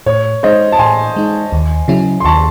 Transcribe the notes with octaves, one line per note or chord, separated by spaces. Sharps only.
A2 C#5
G#3 D#4 C5 D#5
A5
A2 G#5 C6
G#3 D#4
D#2
C#3 F#3 C#4 E4
C6
D#2 A5 C#6